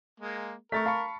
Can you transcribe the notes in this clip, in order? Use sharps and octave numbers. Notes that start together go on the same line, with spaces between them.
G#3 A#3
A3 A#4 C#6 A6 B6
F5 A5 B5 C#6